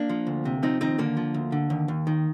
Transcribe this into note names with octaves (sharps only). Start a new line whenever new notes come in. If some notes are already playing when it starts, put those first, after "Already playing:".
Already playing: A#3 D4
F3
D2
C3
F3 C4 D#4
D#2 C4 D#4
D3 A#3
F3
D2
D3
D#2
D#2
D#3